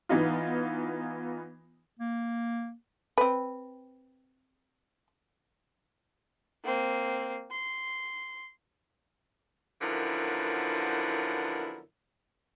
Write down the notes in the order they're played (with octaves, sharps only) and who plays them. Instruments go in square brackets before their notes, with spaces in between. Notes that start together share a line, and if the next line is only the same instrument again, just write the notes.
[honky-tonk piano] E3 B3 D#4 F4
[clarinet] A#3
[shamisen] C4 B4
[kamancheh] A#3 C4
C6
[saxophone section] F#2 D3 F3 B3 E4 A#4